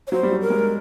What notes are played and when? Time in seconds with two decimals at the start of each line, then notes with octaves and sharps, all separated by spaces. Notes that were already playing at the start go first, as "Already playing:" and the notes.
0.07 C#5
0.12 F#3 C5
0.23 G3
0.31 F#3
0.41 A#4
0.50 G#3